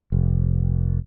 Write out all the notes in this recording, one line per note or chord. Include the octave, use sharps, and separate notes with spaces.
F1